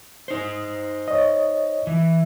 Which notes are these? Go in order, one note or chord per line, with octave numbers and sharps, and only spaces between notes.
D#4 C5
C#5 D#5
E3